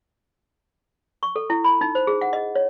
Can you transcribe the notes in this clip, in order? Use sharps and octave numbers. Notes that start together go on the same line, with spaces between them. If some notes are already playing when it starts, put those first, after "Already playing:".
C#6
A4
E4
B5
D#4
C5
G#4
F#5
D#5
C#5